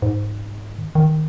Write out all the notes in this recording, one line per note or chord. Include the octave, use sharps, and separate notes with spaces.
G#2
D#3
D#3